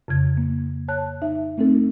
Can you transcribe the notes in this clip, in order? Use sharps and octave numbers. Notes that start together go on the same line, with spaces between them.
F2 C#3 G#6
A#3
C#5 A5 F#6
D#4 E5
A3 C4 D#4 A4